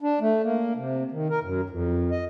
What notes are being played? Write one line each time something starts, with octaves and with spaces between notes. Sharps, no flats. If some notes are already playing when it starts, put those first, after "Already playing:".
D4
A3
A#3
C3
D#3
A#4
F#2
F2
D#5